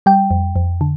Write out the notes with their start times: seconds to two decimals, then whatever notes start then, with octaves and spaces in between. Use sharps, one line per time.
0.06 G3 G5
0.31 F2
0.56 F2
0.81 D3